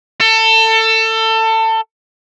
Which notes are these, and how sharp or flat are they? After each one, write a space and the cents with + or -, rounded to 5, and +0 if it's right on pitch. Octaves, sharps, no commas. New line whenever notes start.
A4 +25